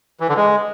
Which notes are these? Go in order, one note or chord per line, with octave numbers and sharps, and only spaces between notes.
E3
D3
G#3